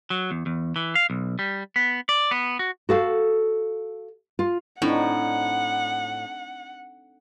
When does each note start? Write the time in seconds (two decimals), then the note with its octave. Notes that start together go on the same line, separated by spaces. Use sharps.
0.10 F#3
0.31 E2
0.46 E2
0.76 E3
0.95 F5
1.10 B1
1.39 G3
1.76 B3
2.09 D5
2.31 B3
2.59 F#4
2.89 F#4 A4 F5
4.39 F4
4.82 A2 C4 D4 D#4 F#5